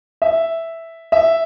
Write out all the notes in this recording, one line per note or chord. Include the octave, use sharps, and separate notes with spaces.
E5
E5